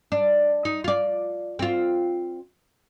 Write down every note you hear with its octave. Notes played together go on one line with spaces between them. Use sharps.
D4
D#4
F4 D5
C4 F4